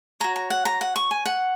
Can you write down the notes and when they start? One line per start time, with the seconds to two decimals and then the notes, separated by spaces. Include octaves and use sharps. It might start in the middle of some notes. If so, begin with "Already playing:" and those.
0.20 F#4 C#5 A#5
0.36 A#5
0.50 F#5
0.65 A#5
0.81 F#5
0.96 C#6
1.11 G#5
1.26 F#5